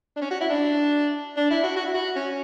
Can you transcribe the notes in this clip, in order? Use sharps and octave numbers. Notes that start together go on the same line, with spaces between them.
D4
C#4
F#4
E4
D4
D4
E4
F#4
F#4
E4
F#4
C#4